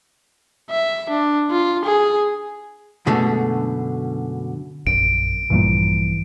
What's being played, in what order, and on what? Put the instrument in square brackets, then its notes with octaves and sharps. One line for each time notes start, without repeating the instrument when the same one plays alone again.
[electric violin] E5
D4
F4
G#4
[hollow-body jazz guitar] F#2 B2 D3 G#3 A3
[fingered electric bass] A#1 F#2 [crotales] D7
[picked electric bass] A#1 G2 A#2 [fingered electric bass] E3